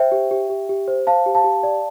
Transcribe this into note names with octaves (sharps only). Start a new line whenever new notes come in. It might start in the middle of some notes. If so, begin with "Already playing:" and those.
Already playing: C5 E5 G5
G4
G4
G4
G4
C5
C5 F5 A5
G4
F5 A5
G4
D5